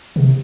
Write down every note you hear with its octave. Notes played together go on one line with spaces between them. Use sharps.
C3